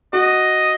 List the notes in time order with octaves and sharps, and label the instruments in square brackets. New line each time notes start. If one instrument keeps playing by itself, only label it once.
[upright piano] F#4 [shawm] D#5